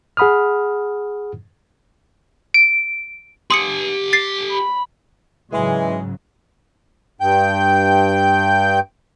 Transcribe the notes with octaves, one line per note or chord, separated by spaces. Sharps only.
G#4 F#5 B5 D#6 F6
D7
G4 G#5 C6 D#6 C#7
A6 C7
B5
G#2 C#3 E3 F#3 G#3
G2 G5 G6